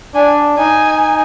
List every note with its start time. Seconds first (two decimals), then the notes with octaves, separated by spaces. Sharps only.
0.15 D4 G#5
0.57 D#4 G#5